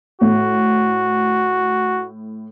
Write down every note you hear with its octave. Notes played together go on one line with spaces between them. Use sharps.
A2 F#4